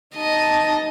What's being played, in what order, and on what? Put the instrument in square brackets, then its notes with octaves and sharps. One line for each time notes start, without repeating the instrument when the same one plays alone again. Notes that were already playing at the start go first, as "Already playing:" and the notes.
[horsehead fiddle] D#4 A5 [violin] D#5